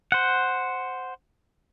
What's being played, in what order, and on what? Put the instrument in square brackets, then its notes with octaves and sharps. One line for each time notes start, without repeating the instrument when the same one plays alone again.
[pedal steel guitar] C5 F#5